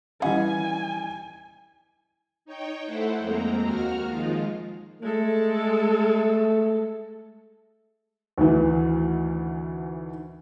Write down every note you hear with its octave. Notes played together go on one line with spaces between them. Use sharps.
E3 G3 C#4 D#5 F#5 G#5
D#4 C#5 G5
A3 E4 A4 C5 F#5
F2 G#3 A#3 C4 A#5
D#2 F#4 A#5 F6
D#3 F3 G#3 F4
G#3 A3 A4
D2 D#3 E3